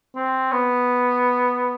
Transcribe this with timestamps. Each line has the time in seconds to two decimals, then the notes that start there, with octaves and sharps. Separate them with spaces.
0.16 C4
0.52 B3